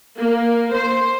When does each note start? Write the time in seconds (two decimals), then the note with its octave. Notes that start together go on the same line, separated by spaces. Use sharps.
0.18 A#3
0.75 C5